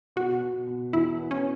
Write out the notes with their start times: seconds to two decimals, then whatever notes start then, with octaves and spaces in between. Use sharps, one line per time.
0.16 B2 F#4
0.42 B2
0.67 B2
0.93 E2 E4
1.19 B3
1.31 C#4